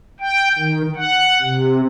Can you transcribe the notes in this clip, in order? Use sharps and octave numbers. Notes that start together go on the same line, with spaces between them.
G5
D#3
F#5
C3